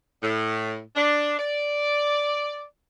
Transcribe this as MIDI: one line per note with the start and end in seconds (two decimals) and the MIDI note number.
0.23 0.79 45
0.96 1.33 62
1.39 2.64 74